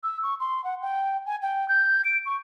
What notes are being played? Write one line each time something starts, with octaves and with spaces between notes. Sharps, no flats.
E6
C#6
C6
F#5
G5
G#5
G5
G6
D7
C#6